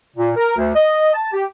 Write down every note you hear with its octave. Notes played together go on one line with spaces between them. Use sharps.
A#2
A#4
D2
D#5
A5
G4